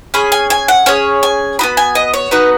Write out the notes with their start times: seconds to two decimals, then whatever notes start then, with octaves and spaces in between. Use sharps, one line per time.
0.14 C#4 G#4 B5
0.32 G#5
0.50 G#5
0.68 F#5
0.86 C#4 G#4 C#5
1.23 G#5
1.59 D#4 F#4 B5
1.63 B3
1.77 G#5
1.95 D#5
2.14 C#5
2.31 B3 D#4 F#4 B4